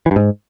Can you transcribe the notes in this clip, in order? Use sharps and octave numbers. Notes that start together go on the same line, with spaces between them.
E3
G2
G#2